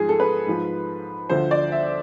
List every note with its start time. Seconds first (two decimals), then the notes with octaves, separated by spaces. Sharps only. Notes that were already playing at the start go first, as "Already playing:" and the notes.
Already playing: G#2 F3 G#4
0.09 A4
0.20 B4
0.47 G#2 F3
1.30 D2 D3 F3 C5
1.51 D5
1.72 E5